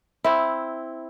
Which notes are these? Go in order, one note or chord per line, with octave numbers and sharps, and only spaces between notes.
C4 E4